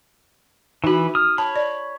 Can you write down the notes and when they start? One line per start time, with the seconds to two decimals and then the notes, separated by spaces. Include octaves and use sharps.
0.84 E3 D#4 F#4 B5
1.15 D#6 F6
1.38 C#5 A5 B5
1.56 D5